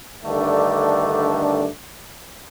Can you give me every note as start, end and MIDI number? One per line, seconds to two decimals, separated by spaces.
0.24 1.68 43
0.24 1.68 50
0.24 1.68 51
0.24 1.68 57
0.24 1.68 62